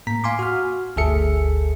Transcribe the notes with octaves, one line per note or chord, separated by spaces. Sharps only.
A2 A#3 A#5 B6
F5 G#5 C6 D6
F#4 F6
G1 D2 G#4 A4 E5 C#7